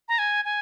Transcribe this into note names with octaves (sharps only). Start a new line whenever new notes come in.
A#5
G#5
G#5